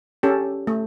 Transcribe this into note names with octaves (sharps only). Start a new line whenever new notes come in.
C#4 G4 A4
A3